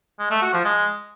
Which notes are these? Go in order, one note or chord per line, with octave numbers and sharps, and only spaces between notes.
G#3
A3
F#4
F3
G#3